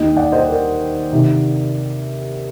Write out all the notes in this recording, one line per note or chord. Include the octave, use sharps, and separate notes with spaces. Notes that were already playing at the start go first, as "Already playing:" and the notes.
Already playing: D#2 D#3 D#5 G5
D5 F#5
C5 D#5
A#4 D5
C3 D#3